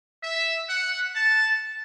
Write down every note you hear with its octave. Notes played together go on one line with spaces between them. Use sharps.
E5
F#5
A5